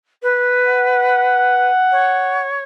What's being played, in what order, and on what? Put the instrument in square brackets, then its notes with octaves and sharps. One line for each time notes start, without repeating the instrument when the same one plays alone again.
[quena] B4
[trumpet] F#5
[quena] C#5